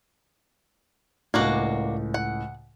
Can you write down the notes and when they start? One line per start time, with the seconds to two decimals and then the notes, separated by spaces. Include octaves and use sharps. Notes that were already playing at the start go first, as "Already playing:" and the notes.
1.34 C#2 A2 A#3 D4 F#4
2.14 F#5